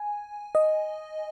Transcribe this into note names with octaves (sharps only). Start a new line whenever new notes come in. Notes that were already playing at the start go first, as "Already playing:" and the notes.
Already playing: G#5
D#5